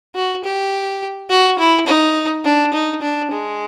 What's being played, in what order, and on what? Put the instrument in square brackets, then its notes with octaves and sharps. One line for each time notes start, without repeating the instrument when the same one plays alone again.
[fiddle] F#4
G4
F#4
E4
D#4
D4
D#4
D4
G#3